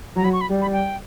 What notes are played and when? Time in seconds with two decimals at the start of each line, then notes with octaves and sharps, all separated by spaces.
0.16 F#3 A#5
0.24 B5
0.33 C#6
0.41 B5
0.50 G3
0.61 B5
0.72 G5